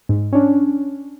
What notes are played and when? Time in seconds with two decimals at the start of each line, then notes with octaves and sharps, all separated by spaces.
0.09 G#2
0.33 C#4 D4